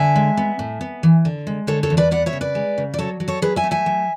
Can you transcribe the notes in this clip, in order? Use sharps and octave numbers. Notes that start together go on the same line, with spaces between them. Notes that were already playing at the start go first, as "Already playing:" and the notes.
Already playing: D3 E5 G#5
G#3
B3
A2
B3
E3
D3
G#3
D3 A4 C#5
A4 C#5
E2
B4 D5
B3 D5 F#5
C#5 E5
C#3
B4 D5
G#3
C#3
D5
F#3 A4 C#5
F#3
A4 C#5
F#3 G#4 B4
E5 G#5
A3
E5 G#5
F#3